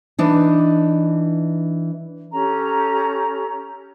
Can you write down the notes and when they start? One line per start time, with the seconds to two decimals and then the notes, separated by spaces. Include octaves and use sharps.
0.19 E3 D4 D#4
2.31 C#4 G4 A4 A#5